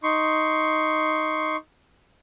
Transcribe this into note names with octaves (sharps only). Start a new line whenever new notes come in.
D#4 C6 C#6